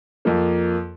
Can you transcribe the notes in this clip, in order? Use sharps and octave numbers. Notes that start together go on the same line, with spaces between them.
F2 F3 A#3